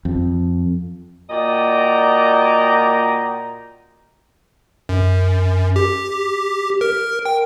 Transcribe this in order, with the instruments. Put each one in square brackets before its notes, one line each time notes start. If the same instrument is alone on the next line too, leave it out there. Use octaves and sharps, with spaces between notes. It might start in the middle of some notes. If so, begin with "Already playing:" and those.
[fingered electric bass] F2
[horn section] A#2 F#4 D5 D#5 G5 A#5
[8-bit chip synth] F#2
G4
A#4
G5